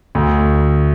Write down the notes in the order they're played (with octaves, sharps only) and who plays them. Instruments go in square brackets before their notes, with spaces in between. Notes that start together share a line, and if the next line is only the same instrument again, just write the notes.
[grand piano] D2